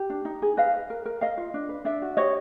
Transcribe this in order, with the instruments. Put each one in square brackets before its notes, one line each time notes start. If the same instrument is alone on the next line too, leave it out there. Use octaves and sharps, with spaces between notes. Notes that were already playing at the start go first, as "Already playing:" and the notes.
Already playing: [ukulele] G4
D4
D#4
G#4
B4 D#5 F5
B4
A#4
A#4
A#4 D#5 F5
F4
D4
B4
D4 D5 E5
F#4
G4 C#5 D#5